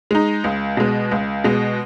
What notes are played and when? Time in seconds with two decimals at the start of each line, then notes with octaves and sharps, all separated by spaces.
0.11 G#3 D#4
0.44 C#2
0.77 B2 G#3
1.11 C#2
1.44 B2 G#3